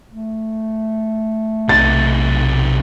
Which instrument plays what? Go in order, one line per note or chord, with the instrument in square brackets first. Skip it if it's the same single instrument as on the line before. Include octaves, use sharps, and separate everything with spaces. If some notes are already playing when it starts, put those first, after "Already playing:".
[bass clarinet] A3
[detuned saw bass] B1 [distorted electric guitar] C3 D#4 [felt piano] A6